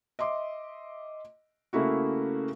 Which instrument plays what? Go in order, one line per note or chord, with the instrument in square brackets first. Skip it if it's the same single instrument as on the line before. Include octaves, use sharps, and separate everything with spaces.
[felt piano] D#5 E5 C6 D6
C#3 A3 A#3 E4 F#4